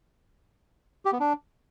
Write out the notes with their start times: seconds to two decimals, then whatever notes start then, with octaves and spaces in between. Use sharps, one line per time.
1.05 G4
1.13 B3
1.20 D4